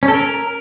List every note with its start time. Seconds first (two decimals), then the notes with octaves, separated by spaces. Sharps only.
0.03 C#4
0.08 A4
0.14 A#4